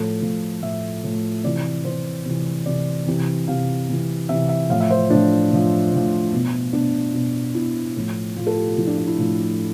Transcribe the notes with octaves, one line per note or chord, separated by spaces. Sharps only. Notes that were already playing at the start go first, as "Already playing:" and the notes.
Already playing: A2 F3 A4
A2 F3
A2 F3 E5
A2 F3
C3 E3 D5
C3 E3 C5
C3 E3
C3 E3 D5
C3 E3
C3 E3 F5
C3 E3
C3 E3 E5
E5
A2 F3 F5
E5
C5
A2 F3 D4
A2 F3
A2 F3
B2
B2 D4
B2
B2 E4
A2 F3
A2 F3 F4
A4
G4
F4
A2 F3 E4
D4
D4
E4
A2 F3 F4